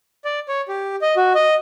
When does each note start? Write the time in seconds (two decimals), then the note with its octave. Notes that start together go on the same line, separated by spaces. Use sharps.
0.25 D5
0.48 C#5
0.69 G4
1.02 D#5
1.17 F#4
1.35 D#5